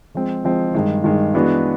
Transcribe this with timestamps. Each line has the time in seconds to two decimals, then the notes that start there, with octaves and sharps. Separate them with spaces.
0.14 F3 G#3 C4
0.44 F3 G#3 C4
0.74 G2 D#3 G#3
1.04 G2 D#3 G#3
1.34 E3 G#3 B3 D4 F#4